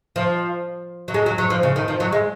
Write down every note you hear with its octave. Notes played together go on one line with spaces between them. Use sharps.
F3
F#3
G#3
F#3
F#3
F3
C#3
D#3
F3
F#3
G#3